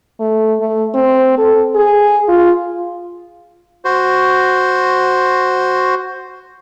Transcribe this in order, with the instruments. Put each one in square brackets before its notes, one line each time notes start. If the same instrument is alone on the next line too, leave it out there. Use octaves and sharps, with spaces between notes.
[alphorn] A3
A3
C4
A4
G#4
F4
[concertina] F#4 C5